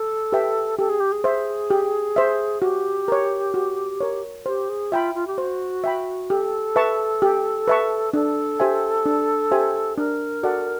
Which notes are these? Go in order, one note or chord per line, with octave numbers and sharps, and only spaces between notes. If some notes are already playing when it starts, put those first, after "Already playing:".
Already playing: A4
G4 B4 E5 G5
G4 A4
G#4
G4
G#4
C5 E5
G4
C5 E5
F#4 G4
A#4 C#5
F#4
A#4 C#5
G4 C5
G#4
F4 E5 G5 B5
F4
G4
F#4 C5
E5 G5 B5
G4 A4
B4 E5 A5 C#6
G4
B4 E5 A5 C#6
D4 A4
G4 C5 E5 G#5
D4
G4 C5 E5 G#5
D4 A#4
F#4 A4 D5 F#5